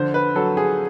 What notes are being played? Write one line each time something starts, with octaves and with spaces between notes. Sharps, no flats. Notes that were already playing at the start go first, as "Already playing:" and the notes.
Already playing: D3 F3 C5
B4
F#3 A4
G#4